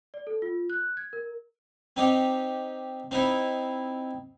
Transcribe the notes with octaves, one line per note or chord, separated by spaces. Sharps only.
D5
A4
F4
F#6
G#6
A#4
C4 D#4 G4
C4 D#4 E4